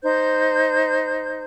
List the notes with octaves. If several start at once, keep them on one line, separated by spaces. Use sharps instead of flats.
D#4 C5 G6